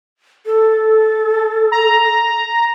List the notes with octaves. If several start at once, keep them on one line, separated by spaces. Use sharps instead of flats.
A4
A#5